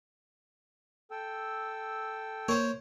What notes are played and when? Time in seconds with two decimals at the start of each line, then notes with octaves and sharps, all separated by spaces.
1.11 A4 G5 E6
2.48 A#3 C5 C#5